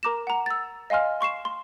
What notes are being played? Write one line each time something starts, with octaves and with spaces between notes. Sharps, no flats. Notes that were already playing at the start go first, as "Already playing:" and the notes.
A#4 A#5 D6 A#6 E7
F#5 A#5
E6 A6
D#5 F5 G#5 C6 F6
C6 C#6 C7 E7
C6